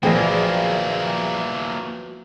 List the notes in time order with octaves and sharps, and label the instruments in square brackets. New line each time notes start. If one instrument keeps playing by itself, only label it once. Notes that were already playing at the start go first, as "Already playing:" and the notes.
[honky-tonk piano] A#1 G#4 G5 [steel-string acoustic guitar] F3 F#3 B3 [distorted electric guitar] A#3 E4